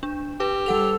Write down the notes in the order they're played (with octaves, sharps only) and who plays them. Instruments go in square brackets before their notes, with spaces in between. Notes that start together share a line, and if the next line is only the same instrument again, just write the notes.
[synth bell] D4
[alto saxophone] G4 [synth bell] B4
[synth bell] G3 F#5 F7 [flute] A4